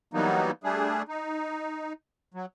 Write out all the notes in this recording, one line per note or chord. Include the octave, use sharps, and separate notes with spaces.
E3 F#3 G3 A#3 B3 D#4
G3 A3 D4 G#4
D#4
F#3